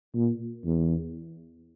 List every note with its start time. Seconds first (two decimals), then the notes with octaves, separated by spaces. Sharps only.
0.15 A#2
0.65 E2